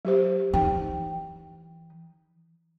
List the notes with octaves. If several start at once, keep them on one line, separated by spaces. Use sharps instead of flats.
F#3 G4 C5
E3 D#4 G5